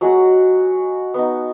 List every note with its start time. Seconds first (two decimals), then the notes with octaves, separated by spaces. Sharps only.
0.01 F#3 G#3 F#4 F#5
1.14 B3 D#4